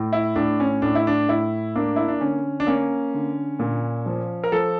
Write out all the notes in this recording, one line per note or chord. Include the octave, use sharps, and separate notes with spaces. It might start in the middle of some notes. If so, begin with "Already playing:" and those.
Already playing: A2
E4
A2 D4
C#4
A2 D4
E4
D4
A2 E4
A#3 D4
E4
D4
D3 C#4
D4
A#3 C#4
D3
A#2
F3
A#4
F3 A4